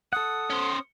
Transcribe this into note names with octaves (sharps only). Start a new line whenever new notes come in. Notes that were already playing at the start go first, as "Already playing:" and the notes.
A4 F#5 D#6
C#4 C5